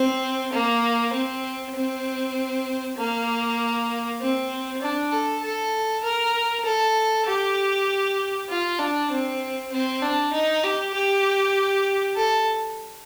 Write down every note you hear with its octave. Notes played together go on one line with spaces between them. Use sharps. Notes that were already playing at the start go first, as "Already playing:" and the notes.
Already playing: C4
A#3
C4
C4
A#3
C4
D4
A4
A4
A#4
A4
G4
F4
D4
C4
C4
D4
D#4
G4
G4
A4